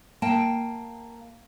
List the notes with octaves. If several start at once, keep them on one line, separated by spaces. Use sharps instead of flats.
A#3 G5 A5